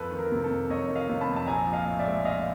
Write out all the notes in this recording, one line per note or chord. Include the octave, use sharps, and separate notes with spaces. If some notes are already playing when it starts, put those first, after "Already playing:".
Already playing: F2 A4 B4
D#3
A#4
C3
A4
F2
F2 C#5 D#5
D#3
D#5 F5
C3
A5 B5
F2
A5
A#1 G#5 A#5
F3
D#5 F5
A2
D5 E5
G#3
A#1 D#5 F5